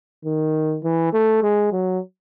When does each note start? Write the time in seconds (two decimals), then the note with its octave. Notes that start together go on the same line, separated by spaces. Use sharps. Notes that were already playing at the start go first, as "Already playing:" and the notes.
0.25 D#3
0.84 E3
1.13 A3
1.43 G#3
1.72 F#3